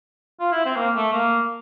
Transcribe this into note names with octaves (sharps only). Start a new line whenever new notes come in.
F4
E4
C4
A#3
A3
A#3